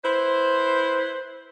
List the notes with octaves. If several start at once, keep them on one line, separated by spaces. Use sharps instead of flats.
E4 B4 C5